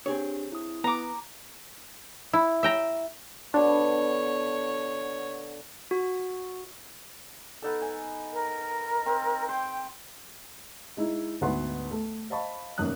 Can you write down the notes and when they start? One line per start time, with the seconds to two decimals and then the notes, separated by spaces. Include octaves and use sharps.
0.06 C4 D4 G4 G#4 C#5
0.52 E4 D#6
0.84 B3 A#5 D6
2.33 E4
2.63 E5 G5 A#5
3.54 B2 D3 D4 C#5
5.91 F#4
7.62 B3 D#4 A4
7.82 G#5
8.33 A#4
9.06 C4
9.49 C5 G5
10.97 G#3 D#4 E4
11.41 D2 G#2 B3 F#4 B4 C6
11.91 A3
12.30 C5 D#5 F5 A5 B5 C#6
12.78 F1 F#2 D#3 A#3 D#6 F#6